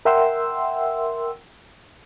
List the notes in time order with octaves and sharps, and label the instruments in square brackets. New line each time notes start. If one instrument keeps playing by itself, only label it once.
[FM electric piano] A#4 E5 F#5 G5 C6 E6